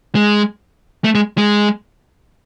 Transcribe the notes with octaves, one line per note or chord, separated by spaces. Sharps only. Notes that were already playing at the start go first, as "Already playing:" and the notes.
G#3
A3
G#3
G#3